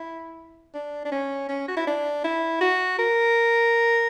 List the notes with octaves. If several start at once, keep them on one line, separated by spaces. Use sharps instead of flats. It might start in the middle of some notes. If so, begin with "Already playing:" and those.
Already playing: E4
D4
D4
C#4
C#4
F#4
E4
D4
E4
F#4
A#4